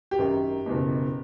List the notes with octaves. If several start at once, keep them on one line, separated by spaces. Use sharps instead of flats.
G4
G#1 F#2 D#3
F#1 E2 B2